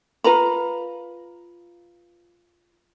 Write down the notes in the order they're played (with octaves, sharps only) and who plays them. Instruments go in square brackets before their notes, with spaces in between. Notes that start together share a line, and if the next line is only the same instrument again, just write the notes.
[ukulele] F4 B4 A#5 B5